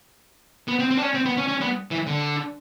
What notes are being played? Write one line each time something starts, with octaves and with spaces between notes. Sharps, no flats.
B3
C4
C4
D4
C#4
C4
B3
C#4
C#4
B3
E3
D3